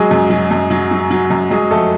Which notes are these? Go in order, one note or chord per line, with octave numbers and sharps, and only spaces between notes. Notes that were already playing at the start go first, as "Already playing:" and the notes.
Already playing: F#3 G#3 G#4
F#2
F#3
F#2
F#3
F#3
F#3
F#2
F#3 G#3 G#4
F2 A3 A4